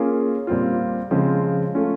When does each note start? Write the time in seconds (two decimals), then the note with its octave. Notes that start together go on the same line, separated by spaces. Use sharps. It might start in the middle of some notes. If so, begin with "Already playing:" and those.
Already playing: A#3 C#4 F4 G#4
0.47 A#2 G3 C4 F4
1.11 C#3 F3 G#3 C4 F4
1.75 A3 C#4 F4